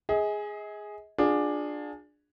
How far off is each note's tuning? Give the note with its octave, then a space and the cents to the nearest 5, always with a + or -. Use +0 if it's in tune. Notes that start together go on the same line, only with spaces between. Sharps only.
G#4 +0 D#5 +40
D4 +10 F4 +30 G#4 +0